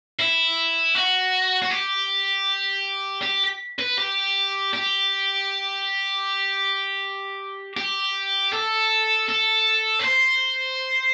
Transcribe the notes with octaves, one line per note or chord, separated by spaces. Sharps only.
E4
F#4
F#4
G4
G4
B4
G4
G4
G4
A4
A4
B4
C5